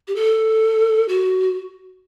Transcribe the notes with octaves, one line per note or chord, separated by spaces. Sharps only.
G4
A4
F#4